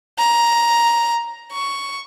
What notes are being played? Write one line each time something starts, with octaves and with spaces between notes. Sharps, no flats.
A#5
C#6